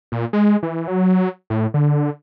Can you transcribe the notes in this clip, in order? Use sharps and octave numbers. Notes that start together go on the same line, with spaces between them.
A#2
G#3
E3
F#3
A2
D3